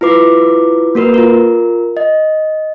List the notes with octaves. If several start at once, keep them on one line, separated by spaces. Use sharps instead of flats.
E4 F4 B4 D6
A#3 F#4 A#4 B4
F4 A#4
D#5